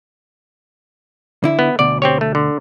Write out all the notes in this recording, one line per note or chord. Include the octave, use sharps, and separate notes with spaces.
D3 E4
B3
D2 B2 D5
C4 G4 C#5
A3
D3